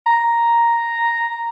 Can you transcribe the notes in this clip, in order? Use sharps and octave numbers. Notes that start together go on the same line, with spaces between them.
A#5